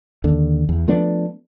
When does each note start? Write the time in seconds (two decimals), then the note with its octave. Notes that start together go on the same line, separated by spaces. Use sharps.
0.24 D#2 D3
0.69 E2
0.88 F3 A3 B3 D4